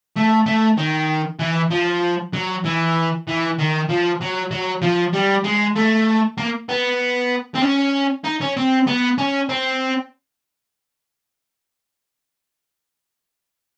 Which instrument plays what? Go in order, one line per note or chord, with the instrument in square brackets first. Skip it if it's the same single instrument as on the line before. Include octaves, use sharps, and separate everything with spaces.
[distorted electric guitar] A3
A3
D#3
E3
F3
F#3
E3
E3
D#3
F3
F#3
F#3
F3
G3
G#3
A3
A#3
B3
C4
C#4
D#4
C#4
C4
B3
C#4
C4